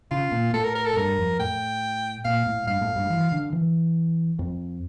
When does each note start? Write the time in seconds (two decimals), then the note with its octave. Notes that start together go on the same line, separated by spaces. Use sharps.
0.11 C#3 F4
0.32 A#2
0.54 A2 A4
0.64 A#4
0.75 A#4
0.86 A4
0.96 G2 A#4
1.18 F2
1.39 A2 G5
2.25 A#2 F5
2.47 A2
2.67 G2 F5
2.81 A2
2.96 G2
3.10 E3
3.32 D3
3.53 E3
4.39 F2